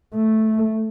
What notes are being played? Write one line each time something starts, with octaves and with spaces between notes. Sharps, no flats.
A3